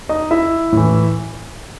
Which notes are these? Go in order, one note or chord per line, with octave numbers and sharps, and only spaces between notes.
D#4 D#5
E4 E5
A2 E3